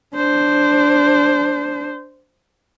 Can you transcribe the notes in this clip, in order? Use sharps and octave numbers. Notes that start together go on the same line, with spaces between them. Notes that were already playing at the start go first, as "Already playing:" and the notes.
D4 C5